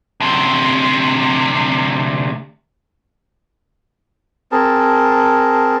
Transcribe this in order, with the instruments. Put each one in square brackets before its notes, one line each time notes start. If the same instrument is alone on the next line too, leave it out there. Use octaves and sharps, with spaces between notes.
[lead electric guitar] D2 C3
[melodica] C4 G#4 A#4 A5